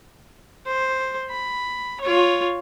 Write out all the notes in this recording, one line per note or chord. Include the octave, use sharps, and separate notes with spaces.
C5
B5
F4 C#5